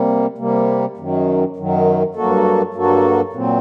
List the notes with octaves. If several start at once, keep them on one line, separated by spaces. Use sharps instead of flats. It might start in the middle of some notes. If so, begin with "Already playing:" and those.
Already playing: C3 G3 A#3
C3 G3 A#3
F#2 D#3 F#3
F#2 D#3 F#3
G2 F#3 A#3 F#4 A4
G2 F#3 A#3 F#4 A4
A#2 F#3 C4